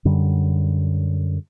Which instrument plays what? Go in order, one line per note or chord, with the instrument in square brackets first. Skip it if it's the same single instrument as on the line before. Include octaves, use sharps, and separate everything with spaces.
[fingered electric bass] F#2 D3 G3